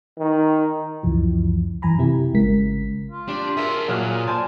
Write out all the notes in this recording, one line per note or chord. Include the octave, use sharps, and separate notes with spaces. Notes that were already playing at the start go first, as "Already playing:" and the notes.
D#3
C#2 F#2 E3 F3
F#2 E3 G#5 A#5 B5
C3 E4 G4
G#1 C#3 G#3 A#4 B6
F4
D4 G4
G#4 A#4 E5
A#2 F#3 F4 G#4 F6 F#6
C5 D5 G#5 A5